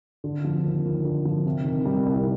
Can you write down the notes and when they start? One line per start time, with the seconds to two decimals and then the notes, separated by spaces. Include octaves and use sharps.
0.24 D3
0.44 F3
0.64 D#2
0.85 D#2
1.04 D3
1.25 F3
1.46 C3
1.65 D#3
1.86 G3
2.06 C2